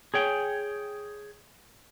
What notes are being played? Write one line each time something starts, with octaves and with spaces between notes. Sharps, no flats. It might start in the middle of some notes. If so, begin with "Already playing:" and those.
G#4 C#5 G5